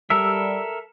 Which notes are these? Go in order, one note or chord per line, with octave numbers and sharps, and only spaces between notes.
G3 A4 A#4 E5 E6